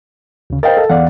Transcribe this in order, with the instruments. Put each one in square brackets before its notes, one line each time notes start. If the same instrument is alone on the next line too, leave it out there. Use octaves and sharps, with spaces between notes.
[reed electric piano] D2 C#3
[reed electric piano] A#4 D#5 F5 [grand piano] C5 G5 A6
[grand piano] A4
[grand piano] E2 [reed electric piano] D5 F5 F#5